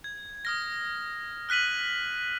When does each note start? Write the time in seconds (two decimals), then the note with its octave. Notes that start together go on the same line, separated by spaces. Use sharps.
0.04 G#6
0.45 D#6 F6 A#6
1.49 F6 F#6 B6 D#7 F#7